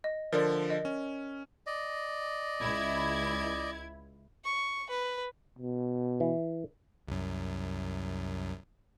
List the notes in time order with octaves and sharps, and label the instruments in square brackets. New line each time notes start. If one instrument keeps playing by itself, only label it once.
[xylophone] D#5
[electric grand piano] D3 F3 [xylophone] A#4 D5
[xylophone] D#5
[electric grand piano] C#4
[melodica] D5 D#5
[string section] C#2 E4 G#6
[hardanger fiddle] C#6
B4
[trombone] B2
[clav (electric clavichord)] E3
[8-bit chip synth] C2 F#2